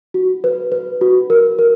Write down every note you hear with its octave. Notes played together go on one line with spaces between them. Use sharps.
F#4
B4
B4
F#4
A#4
A#4